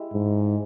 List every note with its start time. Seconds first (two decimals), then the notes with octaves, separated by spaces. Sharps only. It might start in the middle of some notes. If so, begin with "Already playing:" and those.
Already playing: G#3 E4 G4
0.13 G#2